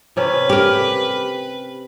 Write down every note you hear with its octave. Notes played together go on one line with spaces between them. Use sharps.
C3 C#4 B4
G4 A#4